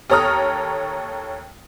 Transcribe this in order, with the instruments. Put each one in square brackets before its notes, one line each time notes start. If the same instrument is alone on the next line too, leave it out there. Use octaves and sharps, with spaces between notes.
[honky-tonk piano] D#2 A4 C#5 A#5 D#6 F6